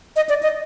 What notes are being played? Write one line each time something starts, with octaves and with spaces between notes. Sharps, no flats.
D#5
D5
D#5